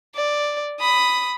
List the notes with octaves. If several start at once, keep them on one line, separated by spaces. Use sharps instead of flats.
D5
B5 D#6